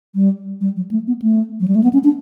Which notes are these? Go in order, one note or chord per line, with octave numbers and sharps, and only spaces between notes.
G3
G3
F#3
A3
B3
A3
F#3
G3
A3
B3
C#4
D4